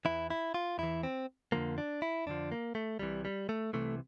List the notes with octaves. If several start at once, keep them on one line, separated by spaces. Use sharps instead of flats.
E2 E3 E4
E4
F4
E2 E3 E4
C4
F2 D3 F3 A#3
D4
E4
F2 D3 F3 D4
A#3
A3
C2 C3 E3 G3
G3
A3
C2 C3 E3 A3